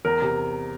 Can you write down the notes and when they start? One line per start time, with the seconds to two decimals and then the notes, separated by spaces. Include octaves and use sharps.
0.05 E2 A#4
0.22 C3